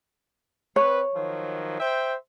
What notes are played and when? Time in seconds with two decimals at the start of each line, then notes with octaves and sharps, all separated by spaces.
0.76 C4 B4 C#5
1.14 D#3 F3 F#3
1.79 C5 E5 G5